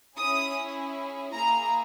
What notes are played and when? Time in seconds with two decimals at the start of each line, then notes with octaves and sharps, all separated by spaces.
0.17 C#4 E4 G#4 D#6
1.32 A#3 E4 G#4 A#5